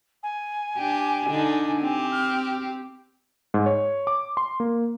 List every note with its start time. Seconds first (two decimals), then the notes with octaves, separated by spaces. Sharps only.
0.23 G#5
0.77 D4 G4
1.28 D3 D4 D#4
1.81 C4 G4
2.12 F6
3.54 G#2
3.66 C#5
4.07 D6
4.37 C6
4.60 A#3